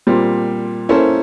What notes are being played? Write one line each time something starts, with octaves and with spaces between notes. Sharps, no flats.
A#2 G3 C4
A#3 C#4 E4 A4 C5